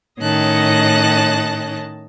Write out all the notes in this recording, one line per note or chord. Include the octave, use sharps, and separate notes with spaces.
A2 D#3 C#4 D#5 A5 F#6